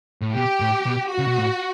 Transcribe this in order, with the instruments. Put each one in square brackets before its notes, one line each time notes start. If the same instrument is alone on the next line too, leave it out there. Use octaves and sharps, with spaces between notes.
[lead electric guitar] A2
[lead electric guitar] B2 [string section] G4
[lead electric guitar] A2
B2
[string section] F#4
[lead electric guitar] C#3
B2
A2